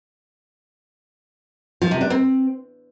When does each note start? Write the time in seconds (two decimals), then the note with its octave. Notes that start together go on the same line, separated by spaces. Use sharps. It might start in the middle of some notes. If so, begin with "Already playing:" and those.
1.81 F3
1.91 C3
2.01 D4
2.10 C4